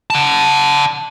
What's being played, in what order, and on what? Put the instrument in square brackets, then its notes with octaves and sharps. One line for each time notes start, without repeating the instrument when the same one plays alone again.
[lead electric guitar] F#5 A5